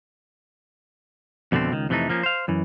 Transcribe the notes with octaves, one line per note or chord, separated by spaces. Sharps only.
F2 B2 D3 A3 C4
C#2 D#3
F2 C3 E3 G3 A3 D#4
F3 A#3 C#4
C5 F5
F#2 E3